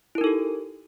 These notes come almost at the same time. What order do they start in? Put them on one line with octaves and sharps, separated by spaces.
E4 A#4 D#4 A4 G4